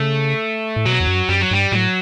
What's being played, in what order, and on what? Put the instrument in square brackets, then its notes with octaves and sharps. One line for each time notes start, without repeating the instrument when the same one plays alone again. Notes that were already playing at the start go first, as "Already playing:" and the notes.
Already playing: [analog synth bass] C#3 [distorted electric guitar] A3
[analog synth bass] A2
[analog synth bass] B2 [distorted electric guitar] F#3
[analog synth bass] E2
F#2
[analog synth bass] F#2 [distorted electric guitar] G3
[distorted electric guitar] F#3
[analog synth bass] G2 [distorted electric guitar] G3
[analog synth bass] A2 [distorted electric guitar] F#3